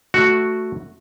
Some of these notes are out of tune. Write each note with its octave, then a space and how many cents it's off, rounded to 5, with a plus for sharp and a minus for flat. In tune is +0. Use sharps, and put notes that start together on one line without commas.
A3 +0 F#4 +0